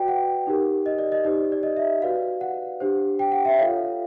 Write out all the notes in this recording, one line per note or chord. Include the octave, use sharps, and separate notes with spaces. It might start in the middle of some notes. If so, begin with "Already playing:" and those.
Already playing: F#4 B4 D5 G5
F#5
D#4 G4 A#4
D#5
D5
D#5
D#4 G4 C5 D5
D5
D#5
E5
F#4 B4 D5 F5
F#5
D4 G4 C5
G5
F#5
E5
F4 A4 C#5 F5